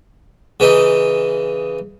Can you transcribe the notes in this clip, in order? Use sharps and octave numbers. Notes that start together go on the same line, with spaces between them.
C#3 E3 D#4